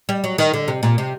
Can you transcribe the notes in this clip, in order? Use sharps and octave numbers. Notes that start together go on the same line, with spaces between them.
G3
F#3
D#3
D3
C3
A#2
C3